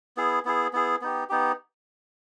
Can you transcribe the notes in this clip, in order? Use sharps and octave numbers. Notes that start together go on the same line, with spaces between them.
B3 E4 G#4
B3 E4 G#4
B3 E4 G#4
B3 D#4 G4
B3 D#4 G4